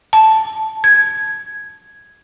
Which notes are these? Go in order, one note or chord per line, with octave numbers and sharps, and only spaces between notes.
A5
G#6